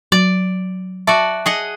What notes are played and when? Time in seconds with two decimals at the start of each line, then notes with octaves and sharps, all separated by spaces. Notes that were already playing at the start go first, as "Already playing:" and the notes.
0.12 F#3 D5
1.07 F#4 D5 E5 A5
1.46 G#4 D#5 F#5